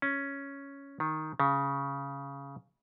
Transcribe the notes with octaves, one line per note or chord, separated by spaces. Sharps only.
C#4
D#3
C#3